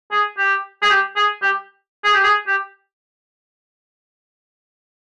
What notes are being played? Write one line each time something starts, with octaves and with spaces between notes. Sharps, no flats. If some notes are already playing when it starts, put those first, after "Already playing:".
G#4
G4
G#4
G4
G#4
G4
G#4
G4
G#4
G4